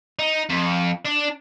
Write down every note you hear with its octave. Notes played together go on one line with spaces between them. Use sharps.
D#4
F2
D4